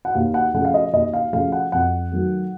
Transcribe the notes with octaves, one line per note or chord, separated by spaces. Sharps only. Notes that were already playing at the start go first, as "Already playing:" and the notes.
F#5
D#2 F5
F#5
C#3 F3 A3 F#5
F5
D#5
D#2 D#5
F5
C#3 F3 A3 F5
F#5
F2 F#5
D#3 F#3 A3